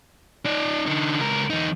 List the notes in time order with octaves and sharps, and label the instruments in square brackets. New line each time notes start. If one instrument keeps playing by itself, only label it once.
[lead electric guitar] D#4 D5
D3 D#4
C#2 A#4
E2 D#4